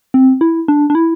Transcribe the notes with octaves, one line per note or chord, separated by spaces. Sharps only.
C4
E4
D4
D4
E4